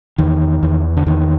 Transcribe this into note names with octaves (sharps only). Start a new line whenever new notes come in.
E2 D#3
E2
D3
E2 D#3